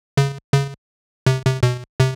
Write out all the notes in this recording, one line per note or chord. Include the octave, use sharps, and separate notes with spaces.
C#3
C#3
C3
C3
B2
C3